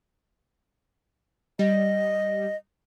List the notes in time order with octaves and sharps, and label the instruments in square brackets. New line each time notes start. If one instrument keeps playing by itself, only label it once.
[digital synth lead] G3 [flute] D#5